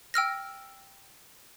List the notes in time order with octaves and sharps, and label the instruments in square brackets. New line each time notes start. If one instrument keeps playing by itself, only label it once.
[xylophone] G5 E6 F6 A#6